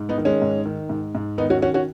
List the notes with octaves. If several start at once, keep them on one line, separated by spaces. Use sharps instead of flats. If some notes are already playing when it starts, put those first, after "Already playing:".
Already playing: G#2
B3 D#4
D#3
G#3 C#4
G#2
D#3
G#2
G#2
D#3 B3 D#4
C#4 F#4
D#3 C#4 F#4
C#4 F#4